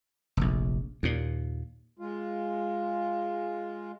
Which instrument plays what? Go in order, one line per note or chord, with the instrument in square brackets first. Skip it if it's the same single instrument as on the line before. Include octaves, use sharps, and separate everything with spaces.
[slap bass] F1 A#1
D#2 A#2
[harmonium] G#3 F4